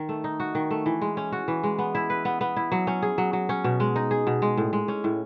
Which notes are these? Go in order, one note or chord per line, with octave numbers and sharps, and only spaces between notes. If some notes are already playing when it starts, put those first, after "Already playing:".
Already playing: D#3
A3
D#4
F#4
D#3
A3
E3
G#3
C#4
F#4
E3
G#3
B3
E4
B4
B3
B3
E4
F#3
C#4
G#4
F#3
F#3
C#4
B2
G#3
D#4
G#4
B2
G#3
A2
G#3
C#4
A2